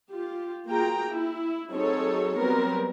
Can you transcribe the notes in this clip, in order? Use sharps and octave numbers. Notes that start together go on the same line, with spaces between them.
F4 G4
A#3 F4 F#4 G#4 G5 A#5
E4
F#3 C4 D#4 G#4 A4 C#5
F#3 G3 B3 C4 A#4